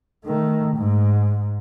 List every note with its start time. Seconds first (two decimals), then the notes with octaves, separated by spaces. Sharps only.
0.25 D#3 A3
0.76 G#2